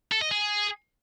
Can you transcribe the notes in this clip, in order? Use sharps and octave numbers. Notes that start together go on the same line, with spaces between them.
A4
D#5
G#4